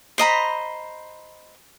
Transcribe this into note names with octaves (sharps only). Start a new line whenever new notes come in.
C5 D#5 A#5 B5